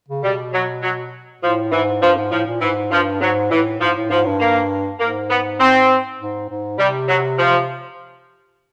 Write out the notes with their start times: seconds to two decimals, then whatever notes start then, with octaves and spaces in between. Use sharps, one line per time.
0.08 C#3
0.23 B2 G3
0.53 F#3
0.83 F#3
1.42 A2 F3
1.72 G#2 E3
2.02 G2 F3
2.17 G#2
2.31 A2 F3
2.47 A#2
2.61 G#2 E3
2.91 G2 F3
3.21 G#2 F#3
3.51 A2 E3
3.81 G#2 F3
3.96 A2
4.10 G#2 F3
4.26 G2
4.40 A#3
5.00 G#2 A#3
5.30 B3
5.60 C4
6.20 G#2
6.49 G#2
6.79 C3 G3
7.09 F#3
7.39 F3